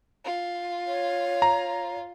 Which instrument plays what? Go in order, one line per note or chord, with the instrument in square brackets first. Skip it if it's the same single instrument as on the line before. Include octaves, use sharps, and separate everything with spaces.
[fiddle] F4
[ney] C#5
[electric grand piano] A#5